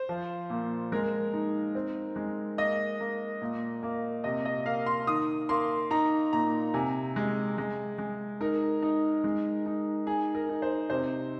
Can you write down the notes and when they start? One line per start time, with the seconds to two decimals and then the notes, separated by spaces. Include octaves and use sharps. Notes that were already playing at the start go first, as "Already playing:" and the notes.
Already playing: C5
0.09 F3
0.50 A#2
0.92 G#3 A#4
1.33 D#4
1.75 C4
2.16 G#3
2.58 A#3 D#5
3.00 A#3
3.42 A#2
3.83 A#3
4.24 C3 D#5
4.45 D#5
4.66 A#3 F5
4.86 C6
5.07 D#3 D#6
5.49 A#3 C6
5.91 D#4 A#5
6.33 A#2 A#5
6.74 C3 G#5
7.16 G#3
7.58 G#3
7.98 G#3
8.41 D#4 A#4
8.82 D#4
9.24 G#3
9.66 D#4
10.07 D#4 G#4
10.35 A#4
10.49 D#4
10.62 C5
10.90 C3 C5